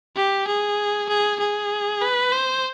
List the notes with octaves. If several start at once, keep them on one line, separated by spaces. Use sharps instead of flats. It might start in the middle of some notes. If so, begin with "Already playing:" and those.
G4
G#4
G#4
G#4
B4
C5